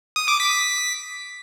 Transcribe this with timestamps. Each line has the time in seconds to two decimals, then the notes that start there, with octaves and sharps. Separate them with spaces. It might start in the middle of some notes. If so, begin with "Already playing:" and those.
0.16 D#6
0.28 D6
0.40 B6
0.52 B6